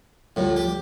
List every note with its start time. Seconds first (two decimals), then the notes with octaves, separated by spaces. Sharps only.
0.36 D2 A2 F3 G3 C4
0.56 G4